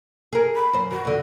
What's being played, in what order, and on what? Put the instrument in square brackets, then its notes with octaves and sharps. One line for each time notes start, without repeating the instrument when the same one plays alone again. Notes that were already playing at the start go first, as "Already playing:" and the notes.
[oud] G#4 A#4
[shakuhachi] B5
[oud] F#2 C5
[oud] D#3 [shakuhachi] F#4
[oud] F2 D3